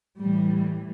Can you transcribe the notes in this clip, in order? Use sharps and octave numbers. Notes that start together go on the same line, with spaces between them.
A2 E3 G3